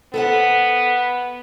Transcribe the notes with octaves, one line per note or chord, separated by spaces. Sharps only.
B3 A4 C5 F#5